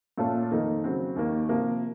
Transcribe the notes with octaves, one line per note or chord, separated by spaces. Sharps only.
A#2 A3 C#4 F4 A4
F2 D#3 A#3 D#4 A4
C#3 F#3 C4
D#2 D#3 A#3
C3 F3 A#3